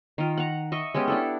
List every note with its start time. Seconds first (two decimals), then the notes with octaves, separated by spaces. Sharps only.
0.18 D#3 F4
0.37 F#5 A#5
0.72 D#5 E5 C#6
0.94 G#3 B3 C#4 G4
1.08 D4 E4 A4